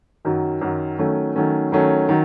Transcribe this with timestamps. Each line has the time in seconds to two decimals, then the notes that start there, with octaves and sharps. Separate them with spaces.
0.25 F#2 D#3 F#3
0.61 F#2 D#3 F#3
0.99 D#3 F#3 A3 C#4
1.36 D#3 F#3 A3 C#4
1.72 D#3 F#3 A3 C#4
2.09 D#3 F#3